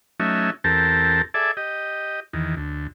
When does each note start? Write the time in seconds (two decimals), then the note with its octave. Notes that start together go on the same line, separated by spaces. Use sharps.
0.20 F#3 A3 C#4 D#4 E5
0.64 E2 C4 G4 A4 A#4 A5
1.34 G#4 A4 D5 E5
1.57 G4 D#5
2.33 E2 D#3
2.57 D2